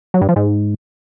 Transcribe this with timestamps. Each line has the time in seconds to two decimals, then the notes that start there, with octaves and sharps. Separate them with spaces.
0.14 F#3
0.21 G2
0.29 F3
0.36 G#2